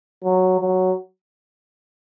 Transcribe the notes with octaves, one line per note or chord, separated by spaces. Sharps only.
F#3
F#3